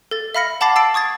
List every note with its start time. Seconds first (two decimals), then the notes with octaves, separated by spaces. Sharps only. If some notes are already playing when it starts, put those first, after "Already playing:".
0.11 A4 A6
0.35 E5 F5 B5 F6 A#6 C#7
0.61 F#5 A5 B5 D6 A6 C7
0.76 A5 E6 A6 C7 D7
0.94 C#6 D#6 G#6 A6 C7